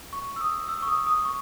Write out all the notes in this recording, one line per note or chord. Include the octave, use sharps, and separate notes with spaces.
C#6
E6
D#6
E6
C#6
D#6
D#6
C#6